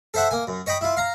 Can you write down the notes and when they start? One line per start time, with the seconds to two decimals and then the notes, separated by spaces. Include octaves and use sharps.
0.14 A4 C5 E5 F#5
0.31 A#3 G#5
0.47 F#2
0.66 C#5 D#5 G5 B5
0.81 E4 F4
0.97 F5 A#5